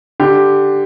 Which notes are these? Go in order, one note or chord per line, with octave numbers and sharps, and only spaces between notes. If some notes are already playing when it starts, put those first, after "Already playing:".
D3 G4